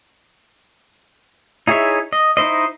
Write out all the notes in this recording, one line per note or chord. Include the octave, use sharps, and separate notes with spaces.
D#4 E4 G#4 C#5 E5
D#5
D#4 E4 C5 D#5